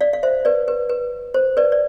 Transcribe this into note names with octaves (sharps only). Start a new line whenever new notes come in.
D5 F5
F5
C5 E5
B4 D5
B4
B4
C5
B4 D5
D5